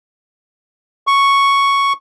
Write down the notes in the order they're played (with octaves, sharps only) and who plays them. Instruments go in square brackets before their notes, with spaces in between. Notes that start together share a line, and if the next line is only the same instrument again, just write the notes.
[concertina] C#6